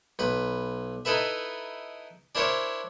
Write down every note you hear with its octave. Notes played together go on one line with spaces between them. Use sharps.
B1 B4
D#4 E4 A4 B4 E5
D4 E4 A#4 C5 C#5